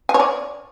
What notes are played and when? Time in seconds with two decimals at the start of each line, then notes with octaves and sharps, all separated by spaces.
0.09 G#5
0.14 C#5
0.20 D5